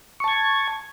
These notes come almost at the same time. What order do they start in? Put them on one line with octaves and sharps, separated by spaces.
C#6 A5 G#6